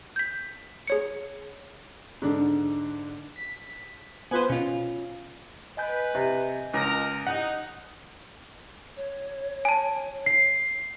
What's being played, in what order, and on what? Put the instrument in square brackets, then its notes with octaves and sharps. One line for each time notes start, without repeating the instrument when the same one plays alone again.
[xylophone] G6 B6
G#4 C#5 C#7
[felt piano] G#2 D3 D4
[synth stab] B6
[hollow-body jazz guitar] B3 C5 [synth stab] F4 B4 G#5
[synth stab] B2 [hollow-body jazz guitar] C#4 F4
[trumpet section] B4 [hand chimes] D#5 G#5 G6
[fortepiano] C3
[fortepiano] C#2 [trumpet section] F4 A#4 A#5
[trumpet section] D#4 [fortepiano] F#5
[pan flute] C#5
[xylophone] G#5 A5
[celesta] C7